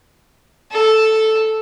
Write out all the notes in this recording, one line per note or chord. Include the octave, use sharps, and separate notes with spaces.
A4